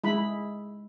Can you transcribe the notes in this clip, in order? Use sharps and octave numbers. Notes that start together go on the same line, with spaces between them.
G#3 E4 B5